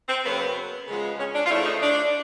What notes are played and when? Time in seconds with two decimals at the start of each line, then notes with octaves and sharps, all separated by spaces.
0.08 C4
0.24 F#2 C#3 F#3 A#3 B3
0.87 C#3 F3 G#3 B3
1.19 C#4
1.34 D4
1.46 F4
1.50 C#3 F3 A3 E4
1.66 D#4
1.82 D4